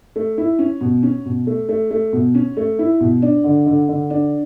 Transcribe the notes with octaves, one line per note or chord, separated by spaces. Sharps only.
A3
E4
C#4
B2
C#4
B2
A3
A3
A3
B2
C#4
A3
E4
B2
D4
D3
D3
D3
D4